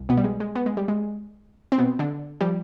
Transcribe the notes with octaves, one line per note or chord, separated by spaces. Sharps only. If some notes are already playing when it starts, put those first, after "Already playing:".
Already playing: C2
B2 B3
G3
G#3
G#3
B3
G#3
G3
G#3
C4
B2 B3
D3 D4
F3 G3 G4